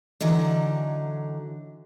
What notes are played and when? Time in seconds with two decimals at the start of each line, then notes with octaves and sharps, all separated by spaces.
0.21 D3 E3 F#3 D#4